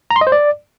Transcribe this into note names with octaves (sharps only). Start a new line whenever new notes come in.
A#5
C6
D#5
C5
D5